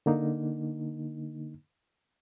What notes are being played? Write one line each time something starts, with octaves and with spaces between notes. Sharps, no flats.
D3 A#3 D#4